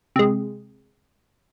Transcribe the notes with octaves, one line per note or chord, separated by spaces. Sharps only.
C3 G#3